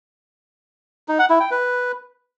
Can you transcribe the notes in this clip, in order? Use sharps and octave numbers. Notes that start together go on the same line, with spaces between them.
D#4
F#5
E4
G5
B4